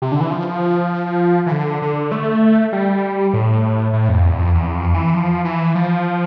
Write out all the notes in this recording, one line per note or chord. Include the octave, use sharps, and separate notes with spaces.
C3
D3
E3
F3
E3
D3
D3
A3
G3
A2
A2
F2
E2
F2
E2
F2
E3
F3
E3
F3